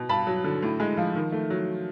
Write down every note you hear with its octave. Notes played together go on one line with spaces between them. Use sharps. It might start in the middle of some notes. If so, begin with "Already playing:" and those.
Already playing: B2
G2 A5 B5
F#3
D3
A2
G#3
F3
D#3
A3
F#3